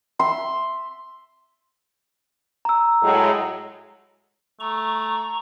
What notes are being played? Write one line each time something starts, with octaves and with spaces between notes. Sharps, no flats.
E5 C6
A#5 E6
A2 F#3 G#3
A3 A#5 C#6